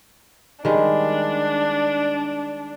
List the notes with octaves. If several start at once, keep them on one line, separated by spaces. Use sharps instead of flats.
D#3 G3 G#3 D4